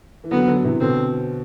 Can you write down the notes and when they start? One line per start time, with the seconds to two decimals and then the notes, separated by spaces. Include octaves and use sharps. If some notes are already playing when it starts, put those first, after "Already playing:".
0.24 E3
0.31 D3 F#3 B3
0.48 D3 F#3
0.64 C3 E3
0.81 B2 D3 C4